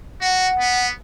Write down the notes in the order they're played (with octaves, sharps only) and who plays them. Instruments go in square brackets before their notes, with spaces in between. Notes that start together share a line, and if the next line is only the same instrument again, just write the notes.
[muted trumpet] F#4 [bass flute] F#5
[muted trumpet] B3